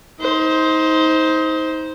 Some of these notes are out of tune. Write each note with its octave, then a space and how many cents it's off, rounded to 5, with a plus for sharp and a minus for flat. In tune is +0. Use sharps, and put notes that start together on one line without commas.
D#4 +30 C5 +0